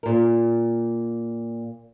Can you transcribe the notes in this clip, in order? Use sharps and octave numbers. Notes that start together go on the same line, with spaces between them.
A#2 A#4